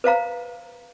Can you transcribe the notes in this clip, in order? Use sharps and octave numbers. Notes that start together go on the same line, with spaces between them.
B4 C5 F5 A#5